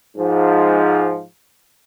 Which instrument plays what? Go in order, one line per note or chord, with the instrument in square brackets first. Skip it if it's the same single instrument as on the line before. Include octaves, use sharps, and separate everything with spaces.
[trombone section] G#2 F3